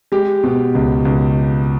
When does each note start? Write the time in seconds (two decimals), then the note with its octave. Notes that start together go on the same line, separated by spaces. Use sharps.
0.12 G#3 G4
0.43 B2
0.75 C#2
1.05 C#2